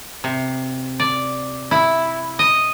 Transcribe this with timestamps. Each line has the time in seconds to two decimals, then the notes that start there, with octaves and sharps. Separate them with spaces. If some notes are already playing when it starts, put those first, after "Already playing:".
0.24 C3
1.00 D5
1.71 E4
2.39 D#5